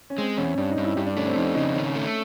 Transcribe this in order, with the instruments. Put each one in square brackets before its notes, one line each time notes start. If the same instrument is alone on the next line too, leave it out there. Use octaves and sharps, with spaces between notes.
[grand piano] C#4
[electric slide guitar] G#3 [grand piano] C4
[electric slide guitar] E2 [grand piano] C#4
[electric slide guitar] G2 [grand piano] D4
[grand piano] D#4
[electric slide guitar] G2
[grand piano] E4
[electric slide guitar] G2 [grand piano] G4
[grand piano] D4
[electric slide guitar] A3 [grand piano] C#4
[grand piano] C4
[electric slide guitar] F2 [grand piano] D#4
[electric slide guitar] C#3 [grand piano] D#4
[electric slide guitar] D#3 [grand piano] C#4
[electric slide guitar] A3